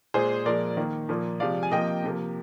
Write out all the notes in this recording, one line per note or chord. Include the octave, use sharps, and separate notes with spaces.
A#2 G#3 G#4 C5
A#2 F3 G#3 A#4 D5
D#3 A#3
A#2 F3 A#3
C3 F3 G#3 D5 F5
G#5
C3 F3 A#3 D#5 G5
C3 F3 A#3